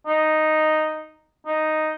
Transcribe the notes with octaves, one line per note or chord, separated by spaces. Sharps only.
D#4
D#4